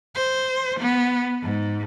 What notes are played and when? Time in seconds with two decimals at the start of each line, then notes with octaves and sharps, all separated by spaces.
0.15 C5
0.80 B3
1.43 G#2